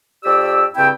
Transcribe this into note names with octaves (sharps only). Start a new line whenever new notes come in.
F2 G4 D5 E6
G2 C#3 C4 E4 G5